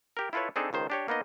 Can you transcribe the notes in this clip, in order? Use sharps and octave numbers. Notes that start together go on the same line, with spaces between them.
G4 A#4
E4 F4 A4 B4 C#5
C4 D4 D#4 G#4 A4
C#2 D#3 C5
D4 G4 C#5
A#3 B3 D#4 D#5